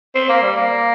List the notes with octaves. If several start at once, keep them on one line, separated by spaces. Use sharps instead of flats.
C4
A#3
G3
A#3